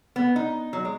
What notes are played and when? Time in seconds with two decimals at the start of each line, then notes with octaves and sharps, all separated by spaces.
0.16 B3
0.36 D#4
0.73 F#3
0.85 G#3